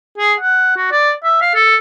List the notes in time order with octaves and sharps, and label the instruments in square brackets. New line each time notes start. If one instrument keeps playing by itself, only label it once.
[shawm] G#4
F#5
F#4
D5
E5
F5
A4